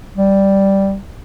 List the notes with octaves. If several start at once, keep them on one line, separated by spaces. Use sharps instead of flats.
G3